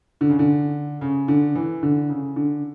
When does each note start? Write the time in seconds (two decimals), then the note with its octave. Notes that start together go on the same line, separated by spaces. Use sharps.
0.21 D3
0.30 C#3
0.39 D3
1.01 C#3
1.28 D3
1.55 E3
1.83 D3
2.09 C#3
2.36 D3